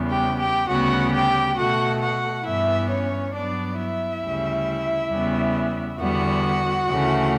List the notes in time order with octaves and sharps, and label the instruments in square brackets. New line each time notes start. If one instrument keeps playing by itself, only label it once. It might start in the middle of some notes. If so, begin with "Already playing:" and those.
Already playing: [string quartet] E2 C#3 G3 B3
G4 G5
G4 G5
D2 C#3 G3 B3 F#4 F#5
G4 G5
B2 A3 F#4 F#5
F#4 F#5
G2 E3 B3 E4 E5
C#4 C#5
G2 F#3 B3 D4 D5
E4 E5
D2 C#3 G3
E2 C#3 G3 B3
E2 D3 G3 B3 F#4 F#5
D2 C#3 E3 A3